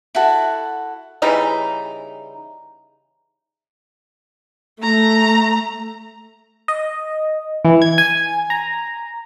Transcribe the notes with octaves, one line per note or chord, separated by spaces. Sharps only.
E4 F#4 A4 F#5
C#3 E3 G3 D#4
A3 A#5
D#5
E3
G#6
G#5
A#5